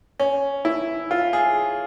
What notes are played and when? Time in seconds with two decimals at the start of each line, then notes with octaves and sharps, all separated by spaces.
0.20 C#4
0.65 E4
1.11 F4
1.33 G#4